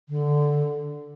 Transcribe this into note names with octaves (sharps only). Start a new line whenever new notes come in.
D3